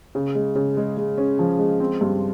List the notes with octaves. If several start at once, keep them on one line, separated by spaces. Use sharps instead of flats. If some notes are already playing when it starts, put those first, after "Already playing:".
C#3
G#3
C#3
G#3
G#3
C#4
F3
G#3
C4
G2